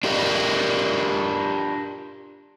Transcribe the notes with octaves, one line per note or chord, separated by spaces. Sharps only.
D4 F4 G4 A#4 D5 D#5